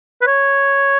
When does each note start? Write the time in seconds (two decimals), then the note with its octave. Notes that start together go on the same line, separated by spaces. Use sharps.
0.21 B4
0.27 C#5